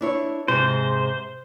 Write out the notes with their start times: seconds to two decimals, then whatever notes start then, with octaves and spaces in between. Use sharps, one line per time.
0.01 D4 E4 C#5
0.48 G#2 C3 G#3 C5